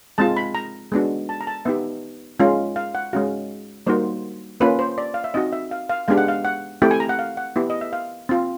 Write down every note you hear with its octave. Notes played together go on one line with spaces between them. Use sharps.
G#3 C4 F4 A5
B5
A#5
G#3 B3 D4 F#4
A5
A#5
A5
B3 D#4 G4 E5
G#3 C#4 F4
F5
F#5
G#3 C#4 F#4 F5
G3 A#3 D#4 F#4 C5
A#3 C#4 F4 B4
C5
D5
F5
E5
C4 D#4 F#4 D#5
E5
F5
F5
G#3 B3 D4 G4 F5
F#5
F5
F#5
A3 C4 E4 G4 G5
G#5
A#5
F#5
F5
F#5
B3 E4 G4
D#5
E5
F5
C4 F4